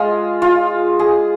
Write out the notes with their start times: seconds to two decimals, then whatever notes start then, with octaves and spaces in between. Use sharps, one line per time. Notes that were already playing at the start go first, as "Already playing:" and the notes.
Already playing: G#3 F4
0.42 F4
0.99 G#4